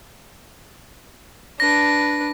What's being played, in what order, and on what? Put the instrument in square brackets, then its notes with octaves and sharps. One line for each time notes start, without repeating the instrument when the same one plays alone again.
[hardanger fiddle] D4 B4 [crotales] A#6